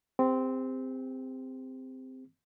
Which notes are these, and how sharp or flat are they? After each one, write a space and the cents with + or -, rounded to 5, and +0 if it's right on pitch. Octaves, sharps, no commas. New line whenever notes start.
C4 -10 G4 +45